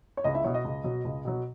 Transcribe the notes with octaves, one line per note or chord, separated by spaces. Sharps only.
C#5
C#2 D#5
E4 E5
B2 F#3 C#5
D#5
C#2
B2 F#3
C#2
B2 F#3